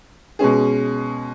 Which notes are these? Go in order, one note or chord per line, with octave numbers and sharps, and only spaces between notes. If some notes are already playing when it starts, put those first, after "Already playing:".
B2 G#3 C#4 G#4